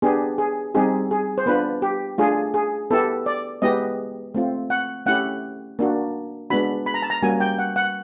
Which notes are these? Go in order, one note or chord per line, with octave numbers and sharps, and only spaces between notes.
B3 D4 G4 G#4
G#4
G3 C4 D#4 G4 G#4
G#4
C5
B3 D4 F4 B4
G4
A3 D4 F4 G#4
G#4
B3 E4 G4 A4
D5
G#3 B3 E4 G4 D#5
A3 C4 F4
F#5
A3 C#4 E4 G4 F#5
A#3 D4 F#4
G#3 B3 D4 F#4 B5
B5
A#5
A5
A#5
G3 A#3 C#4 F#4 G#5
G5
F#5
F#5